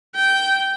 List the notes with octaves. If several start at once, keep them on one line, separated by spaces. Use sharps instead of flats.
G5